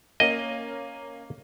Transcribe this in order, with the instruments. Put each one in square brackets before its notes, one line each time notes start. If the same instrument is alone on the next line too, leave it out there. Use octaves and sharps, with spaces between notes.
[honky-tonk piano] A#3 C#4 [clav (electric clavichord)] D#5